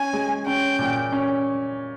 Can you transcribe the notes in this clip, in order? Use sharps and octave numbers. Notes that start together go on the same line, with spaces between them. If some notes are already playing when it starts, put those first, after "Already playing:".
Already playing: C#4 G#5
G#3
C#4 G5
A#2
C#4